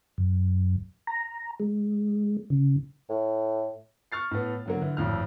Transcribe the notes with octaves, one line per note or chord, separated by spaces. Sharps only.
F#2
A#5
G#3
C#3
A2
C#6 F6 A6 C7
A2 B3
D3 F#3 A#3
D3 E3 E4
G#1 F2 A2 F6